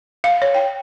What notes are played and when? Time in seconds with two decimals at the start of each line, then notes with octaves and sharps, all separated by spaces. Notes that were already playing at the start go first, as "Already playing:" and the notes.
0.24 F5
0.42 C#5
0.54 G5